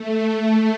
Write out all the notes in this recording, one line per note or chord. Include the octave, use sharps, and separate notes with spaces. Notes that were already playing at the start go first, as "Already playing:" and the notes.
Already playing: A3